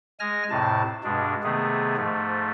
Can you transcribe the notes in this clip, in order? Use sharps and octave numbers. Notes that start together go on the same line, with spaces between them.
G#3 G#5 F6 A#6
F2 A2 C3 A5
G2 B2 G#3 D4
C3 D#3 A3 B3 G#4
G#2 F3 A3